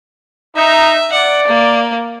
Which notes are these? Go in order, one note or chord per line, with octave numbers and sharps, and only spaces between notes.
D#4 E5
D5 F#5
A#3